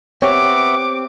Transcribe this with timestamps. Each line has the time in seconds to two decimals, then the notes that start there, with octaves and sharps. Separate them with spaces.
0.22 B3 C4 G4 C#5 E5 F#5 D6